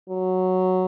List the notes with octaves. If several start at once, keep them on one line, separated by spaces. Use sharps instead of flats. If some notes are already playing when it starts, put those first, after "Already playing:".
F#3